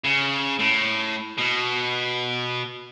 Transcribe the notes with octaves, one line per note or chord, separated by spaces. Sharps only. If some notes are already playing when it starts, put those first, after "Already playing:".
C#3
A2
B2